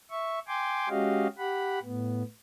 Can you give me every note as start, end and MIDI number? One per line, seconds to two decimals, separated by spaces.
0.11 0.39 76
0.11 0.39 85
0.47 0.89 79
0.47 0.89 80
0.47 0.89 84
0.47 0.89 86
0.89 1.27 56
0.89 1.27 61
0.89 1.27 66
0.89 1.27 67
0.89 1.27 75
0.89 1.27 77
1.38 1.79 67
1.38 1.79 78
1.38 1.79 83
1.83 2.23 45
1.83 2.23 59